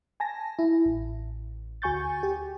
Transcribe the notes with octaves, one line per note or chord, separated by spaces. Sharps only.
G#5 A5 A#6
E4
A1
D2 F#4 G#5 C#6 G6 A6
G4